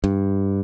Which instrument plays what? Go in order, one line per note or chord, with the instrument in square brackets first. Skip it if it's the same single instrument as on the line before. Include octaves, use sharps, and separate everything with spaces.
[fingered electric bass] G2